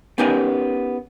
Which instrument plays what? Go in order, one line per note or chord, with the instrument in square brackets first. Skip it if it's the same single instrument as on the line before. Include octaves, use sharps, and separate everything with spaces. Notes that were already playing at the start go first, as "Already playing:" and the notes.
[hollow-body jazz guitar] B3 C#4 D#4 G4 A#4 G#5